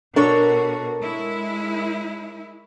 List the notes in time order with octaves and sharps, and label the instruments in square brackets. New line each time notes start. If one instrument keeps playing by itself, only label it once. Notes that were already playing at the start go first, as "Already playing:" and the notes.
[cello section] B2 F#4 [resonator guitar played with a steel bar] D4 A4 C#5 [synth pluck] A#4 C#6
[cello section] G#3 E4